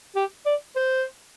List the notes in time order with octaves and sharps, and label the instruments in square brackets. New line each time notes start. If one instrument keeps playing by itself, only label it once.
[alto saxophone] G4
D5
C5